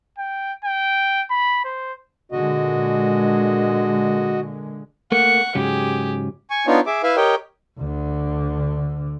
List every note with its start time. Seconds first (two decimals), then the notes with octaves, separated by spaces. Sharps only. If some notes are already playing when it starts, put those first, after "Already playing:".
0.19 G5
0.65 G5
1.31 B5
1.64 C5
2.32 A#2 D3 G#3 F#4 D#5
5.12 A3 A#3 F#5 C#6
5.55 G#2 C#3 F#3 G4 G#4
6.50 G#5 C#6
6.67 B3 D4 D#4 F4 C#5
6.86 G#4 E5 D6
7.03 E4 B4 E5 F5
7.16 G4 A#4 C#5 D#5 G5
7.79 D2 D3